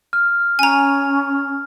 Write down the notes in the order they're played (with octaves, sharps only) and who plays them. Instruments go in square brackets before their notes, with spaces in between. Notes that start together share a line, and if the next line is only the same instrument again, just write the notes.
[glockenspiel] F6
[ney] C#4 [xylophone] G#5 A#5